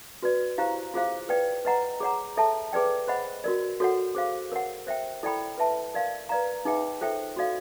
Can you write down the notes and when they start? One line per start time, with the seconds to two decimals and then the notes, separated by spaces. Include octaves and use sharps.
0.23 F#4 B4 D5
0.58 E4 G4 C5 F5 A#5
0.94 F4 G#4 C5 F5
1.29 B4 D5 G5
1.65 B4 D#5 F#5 A#5
2.00 G#4 C#5 F#5 A#5
2.37 A4 C#5 E5 A5
2.73 G#4 B4 D5 G5
3.08 C5 D#5 F#5 B5
3.44 F#4 A#4 D5
3.80 F#4 A4 C#5 F#5
4.15 G#4 C5 F5
4.52 A#4 C#5 F#5
4.87 C5 E5 G5
5.23 E4 A4 D5 G5 B5
5.58 B4 E5 A5
5.94 A#4 D5 F5
6.29 B4 D5 F5 A#5
6.65 D#4 G#4 B4 E5 G5
7.01 F4 A4 C5 E5 G5
7.36 F#4 A4 D5 F5